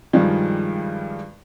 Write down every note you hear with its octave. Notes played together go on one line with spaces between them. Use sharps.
G2 D#3 F3 G3 G#3